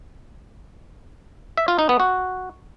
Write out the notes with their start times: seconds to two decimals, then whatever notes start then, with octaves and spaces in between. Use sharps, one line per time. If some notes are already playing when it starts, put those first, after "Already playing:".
1.57 E5
1.68 F4
1.79 D#4
1.89 B3
2.00 F#4